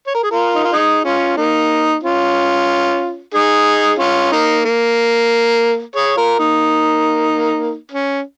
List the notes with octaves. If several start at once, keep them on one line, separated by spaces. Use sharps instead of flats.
C#5
A#4
G#4
F4 A#4
D#4
F4
D#4 G#4
C#4 F4
A#3 D#4
C#4 F4
D#4 G#4
C#4 F4
A#3 D#4
A#3
G#4 C#5
F4 A#4
A#3 D#4
C#4